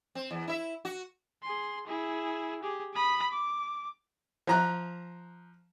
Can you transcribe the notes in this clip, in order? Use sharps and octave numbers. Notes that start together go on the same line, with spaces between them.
C4
E2
E4 E5
F#4
G#4 C6
E4 G#4
G4 G#4
B5 D#6
D6
F3 A#5 F#6